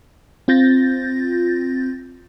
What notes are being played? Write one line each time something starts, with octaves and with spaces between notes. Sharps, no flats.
C4 F4 G6 A6 A#6